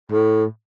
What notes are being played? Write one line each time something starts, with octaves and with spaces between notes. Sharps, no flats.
A2